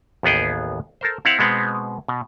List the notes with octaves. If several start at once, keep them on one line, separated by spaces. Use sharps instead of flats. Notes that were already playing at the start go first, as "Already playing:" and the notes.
A1 D#2 B3 G#4 G5
A4 A#4 C5
C4 E4 F5 F#5
B2 G#3 B3 C4
B2